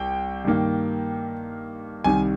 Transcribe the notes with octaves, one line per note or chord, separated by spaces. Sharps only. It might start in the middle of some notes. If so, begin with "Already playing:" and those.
Already playing: C2 G5
G2 D#3 A#3
C2 C3 D#3 G3 G#5